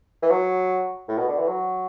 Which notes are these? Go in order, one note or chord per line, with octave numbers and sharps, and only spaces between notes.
E3
F#3
A2
B2
D3
E3
F#3